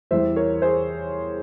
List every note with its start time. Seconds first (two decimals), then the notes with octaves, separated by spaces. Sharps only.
0.11 E2 E3 G3 C5 E5
0.36 A#4 C#5
0.62 G#4 C5